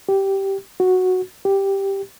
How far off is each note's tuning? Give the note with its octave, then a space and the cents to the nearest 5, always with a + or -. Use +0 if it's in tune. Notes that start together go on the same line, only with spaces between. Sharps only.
G4 -10
F#4 -5
G4 +0